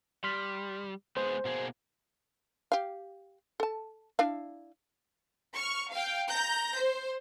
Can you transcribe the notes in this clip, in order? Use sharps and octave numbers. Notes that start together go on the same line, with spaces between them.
G3 C6 F6 B6
G#3 B3 G#4 C5
B2 A#3 G#4
G4 F5
A4 A5
D4 E4 F5
C#6 F6
F5 G5
A#5 G6 A#6
C5